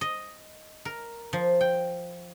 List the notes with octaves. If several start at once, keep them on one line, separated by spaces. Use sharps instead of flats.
D#5
A#4
F3
G5